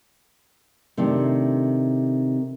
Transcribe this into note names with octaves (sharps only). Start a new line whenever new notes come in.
C3 D#3 A3 D4